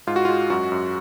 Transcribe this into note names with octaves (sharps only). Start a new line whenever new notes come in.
G#2 F4
F#4
G#3 F4
F#2 F#4
F#2